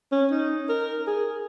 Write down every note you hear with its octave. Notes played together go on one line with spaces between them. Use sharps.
C#4
D#4
A#4
G#4